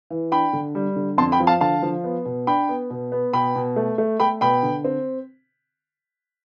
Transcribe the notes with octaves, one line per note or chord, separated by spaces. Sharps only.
E3
D4 G5 B5
D3
G3
D3
F2 A5 C6
G5 B5
F3
F5 A5
D3 F5 A5
F3
B3
B2
D4 G5 B5
B3
B2
B3
B2 G5 B5
B2
A3
A3
A3 G5 B5
B2 G5 B5
D3
C4